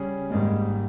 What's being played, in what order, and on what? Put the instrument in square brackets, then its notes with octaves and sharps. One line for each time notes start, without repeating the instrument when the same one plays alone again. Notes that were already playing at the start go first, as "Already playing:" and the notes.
Already playing: [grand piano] C#3 G3 C#4 G#4
[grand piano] G#1 G#2 G3 A#3 [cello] G#3